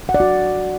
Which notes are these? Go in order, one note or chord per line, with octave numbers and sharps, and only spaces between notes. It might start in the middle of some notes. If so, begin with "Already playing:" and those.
F#5
D5
F#4